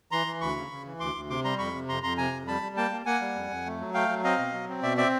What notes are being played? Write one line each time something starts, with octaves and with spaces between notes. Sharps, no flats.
E3 A#5 C6
E3
D2 B5 C#6
C#3
C#3
E3
D2 C6 D6
D2
C3 C6 D6
G3 A#5 C6
F2 B5 C#6
C3
F2 A#5 C6
F2 A#5 C6
C3 G#5 A#5
F2
G3 A5 B5
G3
A#3 G5 A5
A#3
A#3 F#5 G#5
G3
F2
F2
A3
F#3
A3 F5 G5
F#3
C4 D#5 F5
B2
F#3
C4
B2 D5 E5
C4 D5 E5